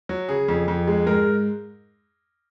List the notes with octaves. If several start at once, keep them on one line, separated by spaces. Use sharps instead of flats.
F#3
C#3 G#4
F2
F2
G#3
G#2 A#4